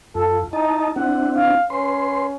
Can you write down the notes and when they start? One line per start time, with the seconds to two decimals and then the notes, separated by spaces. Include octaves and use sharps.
0.15 F#2 F4 A4
0.53 D#4 E4 D#5 A5
0.96 C4 D4 E4 F#5
1.36 F5
1.70 C#4 B4 C6